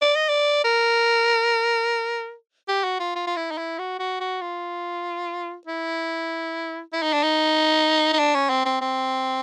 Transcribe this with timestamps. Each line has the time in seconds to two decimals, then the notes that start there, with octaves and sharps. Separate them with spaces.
0.02 D5
0.16 D#5
0.29 D5
0.64 A#4
2.68 G4
2.84 F#4
3.00 F4
3.16 F4
3.27 F4
3.37 E4
3.51 D#4
3.58 E4
3.79 F#4
3.99 F#4
4.20 F#4
4.41 F4
5.67 E4
6.93 E4
7.02 D#4
7.13 D4
7.23 D#4
8.13 D#4
8.19 D4
8.34 C#4
8.50 C4
8.65 C4
8.81 C4